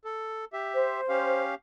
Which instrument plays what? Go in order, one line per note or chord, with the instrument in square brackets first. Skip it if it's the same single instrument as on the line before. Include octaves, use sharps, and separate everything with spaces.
[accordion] A4
G4 E5
[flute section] C5
[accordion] C#4 G4 F5